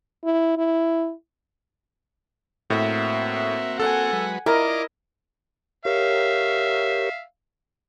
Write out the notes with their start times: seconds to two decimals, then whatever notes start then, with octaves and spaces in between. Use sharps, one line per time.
0.24 E4
0.58 E4
2.70 A2 A#3 C4 F#4 E5
3.80 A4 F#5 G#5
4.13 F#3 G#3 B4
4.46 E4 F4 A#4 D5 D#5 D6
5.85 G4 A#4 C#5 E5 F5